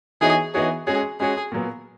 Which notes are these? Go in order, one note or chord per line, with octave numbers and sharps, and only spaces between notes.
E3 B3 D#4 F#4 G#4 C#5
E3 B3 D#4 F#4 G#4 C#5
G#3 C#4 F#4 G#4 C#5
G#3 C#4 F#4 G#4 C#5
A#2 F#3 B3